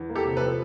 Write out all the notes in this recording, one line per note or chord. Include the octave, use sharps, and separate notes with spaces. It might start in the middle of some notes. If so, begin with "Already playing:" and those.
Already playing: E2
A#3
G4 A4
C3
A4 B4
F3